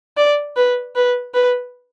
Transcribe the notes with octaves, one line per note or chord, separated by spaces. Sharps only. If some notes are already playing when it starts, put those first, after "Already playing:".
D5
B4
B4
B4